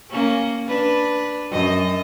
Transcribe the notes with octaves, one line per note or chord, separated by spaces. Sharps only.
A#3 C#4
D4 B4
F#2 D#5